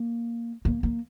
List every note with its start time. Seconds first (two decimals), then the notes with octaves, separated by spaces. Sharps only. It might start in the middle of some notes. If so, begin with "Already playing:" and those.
Already playing: A#3
0.65 A#3
0.83 A#3